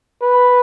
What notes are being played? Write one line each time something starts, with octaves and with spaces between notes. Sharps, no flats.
B4